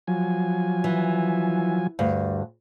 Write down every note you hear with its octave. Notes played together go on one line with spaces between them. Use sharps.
F3 F#3 G#5
E3
D2 G2